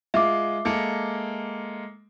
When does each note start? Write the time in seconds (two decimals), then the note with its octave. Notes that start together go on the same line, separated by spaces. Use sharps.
0.14 G#3 F4 E5 D6
0.65 G#3 A#3 A4